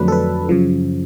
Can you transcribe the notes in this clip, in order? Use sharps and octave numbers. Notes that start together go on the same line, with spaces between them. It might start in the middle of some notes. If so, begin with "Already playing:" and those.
Already playing: F2 D3 F#3 A3 D4 B4
A4
B4
F#2 C#3 F3